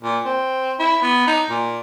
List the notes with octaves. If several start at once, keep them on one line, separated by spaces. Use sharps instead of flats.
A#2
C4
E4
B3
D#4
A#2